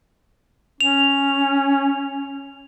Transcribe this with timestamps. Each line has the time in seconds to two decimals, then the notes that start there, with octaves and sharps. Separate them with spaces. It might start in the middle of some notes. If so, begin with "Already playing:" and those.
0.81 C#4 F7